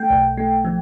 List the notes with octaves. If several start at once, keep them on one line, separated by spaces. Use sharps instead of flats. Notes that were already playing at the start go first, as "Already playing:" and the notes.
Already playing: A3 G5
B1
A3
F3